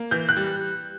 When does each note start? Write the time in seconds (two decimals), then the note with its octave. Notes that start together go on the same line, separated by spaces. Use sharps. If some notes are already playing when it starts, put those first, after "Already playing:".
Already playing: A#3
0.11 E3 G6
0.29 F#6
0.37 G3